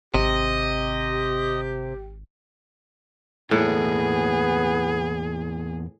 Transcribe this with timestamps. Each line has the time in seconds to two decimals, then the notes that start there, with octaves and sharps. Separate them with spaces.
0.14 G#1 C3 G4 D#5
3.51 E2 A2 A#3 B3 G#4 A4